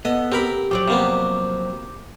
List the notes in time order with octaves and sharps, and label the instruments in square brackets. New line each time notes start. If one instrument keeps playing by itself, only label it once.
[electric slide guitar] B3 [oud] A4 [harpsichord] D#5
[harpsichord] C4 A#4 B5 [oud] G4
[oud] F3 F#3 D5 [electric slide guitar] G4
[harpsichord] C3 A#3 B3